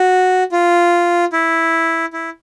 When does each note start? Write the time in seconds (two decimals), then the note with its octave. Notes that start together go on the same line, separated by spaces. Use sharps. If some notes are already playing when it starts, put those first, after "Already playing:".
Already playing: F#4
0.52 F4
1.33 E4
2.13 E4